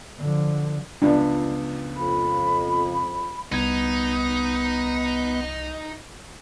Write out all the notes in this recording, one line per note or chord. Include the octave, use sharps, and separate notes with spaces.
D3 F3
C#2 F3 B3 D4
F2 B5
C2 B3 D#4 G#6